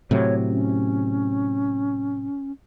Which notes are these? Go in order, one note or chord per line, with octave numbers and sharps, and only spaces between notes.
A2 C3 F#3 C#5
C#4